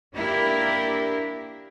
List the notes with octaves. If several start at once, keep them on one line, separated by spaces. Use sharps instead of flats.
A#3 D4 E4 G4 A#4